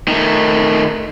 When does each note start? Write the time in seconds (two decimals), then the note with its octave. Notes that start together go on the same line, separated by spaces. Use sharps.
0.08 D#3 A3